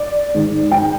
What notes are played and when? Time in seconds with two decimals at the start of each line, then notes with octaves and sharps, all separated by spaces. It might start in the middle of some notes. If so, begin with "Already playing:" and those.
Already playing: D5
0.34 G#2 D#3
0.71 G5